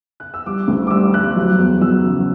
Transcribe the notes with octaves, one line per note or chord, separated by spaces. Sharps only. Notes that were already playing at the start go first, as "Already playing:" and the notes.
F#6
E6
G3 D6
D2
D6
G3 E6
G3 F#6
F#3
E2
F#3 E6
C#3